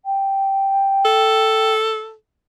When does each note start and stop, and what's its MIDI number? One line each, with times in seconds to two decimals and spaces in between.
0.05 1.73 79
1.05 2.13 69